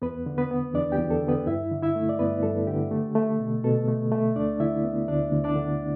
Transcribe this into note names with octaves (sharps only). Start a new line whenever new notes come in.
E2 B3 B4
D3
B3 B4
B3
E2 D4 D5
G4 G5
E2
A4
D3
B3 B4
G2 E4 E5
D3
E4 E5
A3
D5
G2 B3 B4
G2 A4
D3 G4
A3
A3
B2
B2 A4
A3
A3
D2 D4 D5
D3 E4 E5
B3
D2 D4 D5
D2
D4 D5
D3